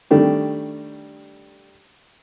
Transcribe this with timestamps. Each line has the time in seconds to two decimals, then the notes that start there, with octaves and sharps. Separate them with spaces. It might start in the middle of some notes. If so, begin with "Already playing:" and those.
0.11 D#3 G3 A3 D4 G4